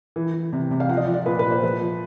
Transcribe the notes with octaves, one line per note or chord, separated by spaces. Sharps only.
E3
E3
C3
C3
F5
F3 F#5
D#5
D5
F3
D5
A#2 B4
B4
A#2
C5
F3 B4
F3